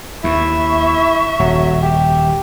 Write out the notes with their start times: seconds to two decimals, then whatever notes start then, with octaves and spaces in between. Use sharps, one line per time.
0.24 D#2 E4 E5 C#6
1.39 D#1 F#3
1.82 G4